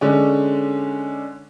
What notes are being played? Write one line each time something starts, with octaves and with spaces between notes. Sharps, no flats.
D3 G#3 C#4